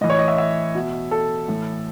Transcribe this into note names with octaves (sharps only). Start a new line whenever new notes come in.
A2 E3 D#5
C#5
D#5
E5
E5
B2
A4
A2 E3